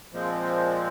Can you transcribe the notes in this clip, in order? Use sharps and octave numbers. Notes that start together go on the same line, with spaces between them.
A#2 F3 G#3 C4